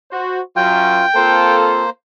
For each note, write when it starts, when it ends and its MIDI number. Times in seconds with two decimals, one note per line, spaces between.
0.11 0.39 66
0.11 0.39 72
0.56 1.03 42
0.56 1.03 54
0.56 1.06 65
0.56 1.56 79
1.15 1.90 58
1.15 1.83 60
1.15 1.83 65
1.15 1.83 69
1.15 1.90 72